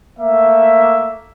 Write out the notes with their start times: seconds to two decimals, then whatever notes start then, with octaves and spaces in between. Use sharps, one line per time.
0.19 A3 A#3 E5